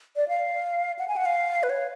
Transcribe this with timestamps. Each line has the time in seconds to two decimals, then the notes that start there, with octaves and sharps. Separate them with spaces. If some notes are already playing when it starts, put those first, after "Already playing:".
0.16 D5
0.28 F5
0.99 F#5
1.08 G#5
1.16 F#5
1.26 F5
1.63 B4
1.70 C#5